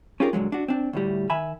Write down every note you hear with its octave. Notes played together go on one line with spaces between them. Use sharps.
C#4 D#4 F4 G4 G#4 A#4
A#2 D3 F3 F#3 G#3
D4 F#4
C4 D4
D2 A2 G3
D#3 E5 G#5 B5